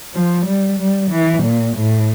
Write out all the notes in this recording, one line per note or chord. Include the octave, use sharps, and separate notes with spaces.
F3
G3
G3
E3
A#2
A2